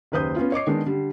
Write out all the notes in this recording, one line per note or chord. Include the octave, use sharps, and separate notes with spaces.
F#1 D#2 B4 C5 D#6 G6
B3 C#4 F4
C#5 D#5 D6 C7
D#3 G#3 B3 D4
D3 G3